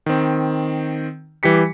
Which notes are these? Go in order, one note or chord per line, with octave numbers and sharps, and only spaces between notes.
D#3 C4
E3 G3 G4 B6 C#7